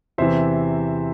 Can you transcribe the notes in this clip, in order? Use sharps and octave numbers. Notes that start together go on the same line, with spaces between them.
E2 C3 E3 C5 E5